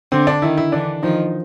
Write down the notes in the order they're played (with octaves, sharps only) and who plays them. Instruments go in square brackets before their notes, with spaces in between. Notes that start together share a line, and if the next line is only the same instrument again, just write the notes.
[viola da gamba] D3 [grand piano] C4
[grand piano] D4
[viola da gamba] D#3 [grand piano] E4
[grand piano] E4
[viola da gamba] D3 E3 [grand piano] D4
[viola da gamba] D#3 F3 [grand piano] D#4